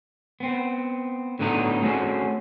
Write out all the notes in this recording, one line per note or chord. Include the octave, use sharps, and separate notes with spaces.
B3 C4
A2 D3 F#3 B3 D#4
A3 C4 C#4 F#4 G#4